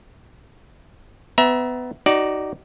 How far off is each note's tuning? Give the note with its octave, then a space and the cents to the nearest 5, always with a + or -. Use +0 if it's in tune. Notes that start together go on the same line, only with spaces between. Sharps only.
B3 +25 E5 +0 A#5 +30
D#4 +0 F#4 +35 D5 +0